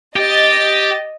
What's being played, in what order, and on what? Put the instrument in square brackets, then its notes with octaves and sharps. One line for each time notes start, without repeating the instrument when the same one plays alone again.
[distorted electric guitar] G4 [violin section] D#5 A6